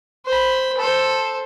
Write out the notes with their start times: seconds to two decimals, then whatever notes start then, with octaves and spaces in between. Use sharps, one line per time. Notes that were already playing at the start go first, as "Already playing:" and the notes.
0.26 C5 B5
0.78 A4 C5